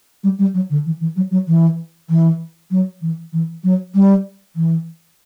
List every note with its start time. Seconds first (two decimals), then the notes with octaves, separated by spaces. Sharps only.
0.24 G3
0.39 G3
0.54 F#3
0.70 D3
0.86 E3
1.01 E3
1.16 F#3
1.31 F#3
1.48 E3
2.10 E3
2.71 F#3
3.01 E3
3.33 E3
3.64 F#3
3.95 G3
4.56 E3